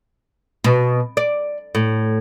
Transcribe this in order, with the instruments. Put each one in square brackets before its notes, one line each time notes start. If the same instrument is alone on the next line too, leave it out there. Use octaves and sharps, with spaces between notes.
[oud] B2
D5
A2